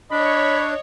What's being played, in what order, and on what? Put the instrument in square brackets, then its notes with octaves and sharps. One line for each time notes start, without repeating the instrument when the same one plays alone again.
[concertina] D4 [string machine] C#5 [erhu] D#5 [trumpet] B5